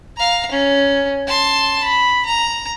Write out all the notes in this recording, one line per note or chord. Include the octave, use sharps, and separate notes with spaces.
F5 A#5
C#4
A5 C6
B5
A#5